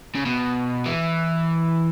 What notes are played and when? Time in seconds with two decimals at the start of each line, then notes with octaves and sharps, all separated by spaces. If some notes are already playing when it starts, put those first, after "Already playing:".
0.15 C#3
0.26 B2
0.86 E3